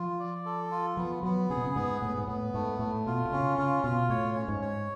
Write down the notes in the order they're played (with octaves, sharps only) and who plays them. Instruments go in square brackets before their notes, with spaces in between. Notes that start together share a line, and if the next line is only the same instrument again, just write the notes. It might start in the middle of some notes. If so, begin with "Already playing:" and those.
Already playing: [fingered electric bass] F3 [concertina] F4
[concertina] D5
A4
F4
[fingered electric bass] F3 [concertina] B3
[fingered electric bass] F#3 [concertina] B3
[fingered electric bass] C#3 [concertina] G#4
[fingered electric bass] B2
C#3
[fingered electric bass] G#2 [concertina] B3
[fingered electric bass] A2 [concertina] B3
[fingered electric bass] G#2
[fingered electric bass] A2 [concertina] B3
[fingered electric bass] G#2 [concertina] A3
[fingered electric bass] A2 [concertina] A3
[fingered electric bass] B2 [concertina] F4
[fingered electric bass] B2
[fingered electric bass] C#3 [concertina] C#4
[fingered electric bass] C#3 [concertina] F4
[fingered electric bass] B2 [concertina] F4
[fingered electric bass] A2 [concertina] C#5
[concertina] C#4
[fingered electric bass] G#2
[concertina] C#5